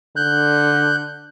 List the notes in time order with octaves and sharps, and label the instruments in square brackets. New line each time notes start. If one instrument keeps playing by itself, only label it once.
[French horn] D3 [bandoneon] F#6 G6